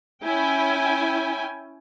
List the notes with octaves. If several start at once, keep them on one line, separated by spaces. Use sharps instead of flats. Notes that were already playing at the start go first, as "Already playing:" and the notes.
C#4 E4 G5 G#5